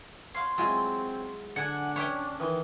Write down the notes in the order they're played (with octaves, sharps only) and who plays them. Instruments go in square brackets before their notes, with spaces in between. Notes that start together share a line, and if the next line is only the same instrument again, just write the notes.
[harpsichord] C#5 F5 F#5 [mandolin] C6
[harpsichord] F#3 E4 F4 [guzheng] G#3 [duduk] C4
[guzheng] D3 [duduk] D4 [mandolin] F#5 G#5
[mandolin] C#4 [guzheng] C#5 E5 G5
[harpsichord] D#3 E3